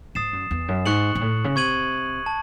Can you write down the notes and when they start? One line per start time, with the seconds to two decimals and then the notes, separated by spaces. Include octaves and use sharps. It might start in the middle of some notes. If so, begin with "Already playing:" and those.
0.15 G#2 D#6 A6 C7 E7
0.33 F#2
0.51 E2
0.68 F#2
0.86 G#2 C#6 F#6 C#7 F#7
1.15 G#2
1.21 A2
1.44 C#3
1.56 C3 C#6 G#6 D#7 F#7
2.26 A5